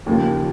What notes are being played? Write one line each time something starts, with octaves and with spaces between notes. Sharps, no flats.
D#2 C#3 F3 A#3 F4